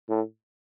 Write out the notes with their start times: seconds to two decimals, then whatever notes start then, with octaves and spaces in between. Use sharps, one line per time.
0.09 A2